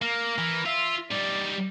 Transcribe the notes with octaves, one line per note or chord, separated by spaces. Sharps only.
A#3 A#4
E3
F4 E5
G3 D#4 D5